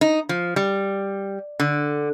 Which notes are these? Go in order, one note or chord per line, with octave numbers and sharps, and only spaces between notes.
D#4
F3
G3
D3